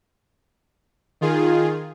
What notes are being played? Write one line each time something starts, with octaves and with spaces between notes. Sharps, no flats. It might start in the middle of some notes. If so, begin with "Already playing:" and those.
D#3 F4 G#4